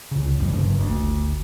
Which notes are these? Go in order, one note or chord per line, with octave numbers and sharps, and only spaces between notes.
C#2 C#3
E1 F#2 G3
F#1 G2
D2
G1